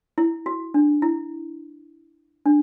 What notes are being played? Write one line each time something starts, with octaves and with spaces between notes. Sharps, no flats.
E4
F#4
D4
E4
D4